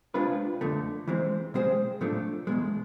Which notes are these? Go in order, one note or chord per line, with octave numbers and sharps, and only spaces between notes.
C3 G#3 D4 F4 B4
F2 D3 A3
E3 G#3 C4
B2 G#3 C4 G#4 C5
A2 F3 A3 D4
E2 B2 G#3